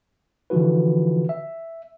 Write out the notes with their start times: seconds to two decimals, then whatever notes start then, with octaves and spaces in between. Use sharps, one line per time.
0.50 D3 E3 F3 F4 F#4 B4
1.29 E5